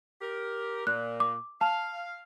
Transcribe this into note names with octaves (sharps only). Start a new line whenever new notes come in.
G4 A#4
A#2 F#6
D6
F5 A5